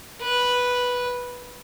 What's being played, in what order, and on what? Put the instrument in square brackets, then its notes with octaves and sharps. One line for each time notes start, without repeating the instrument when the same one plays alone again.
[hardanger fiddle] B4